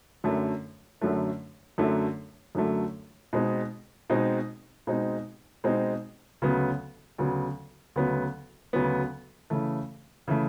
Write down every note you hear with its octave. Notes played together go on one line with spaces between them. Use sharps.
F#2 D3 F#3 A3
F#2 D3 F#3 A3
F#2 D3 F#3 A3
F#2 D3 F#3 A3
B2 G#3 C4 D#4
B2 G#3 C4 D#4
B2 G#3 C4 D#4
B2 G#3 C4 D#4
D2 C#3 F#3 B3
D2 C#3 F#3 B3
D2 C#3 F#3 B3
D2 C#3 F#3 B3
C#3 E3 A3
C#3 E3 A3